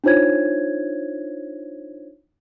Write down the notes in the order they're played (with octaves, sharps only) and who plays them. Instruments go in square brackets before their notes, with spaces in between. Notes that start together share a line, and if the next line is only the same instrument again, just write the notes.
[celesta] D4 D#4 F4 C5 C#5 G#6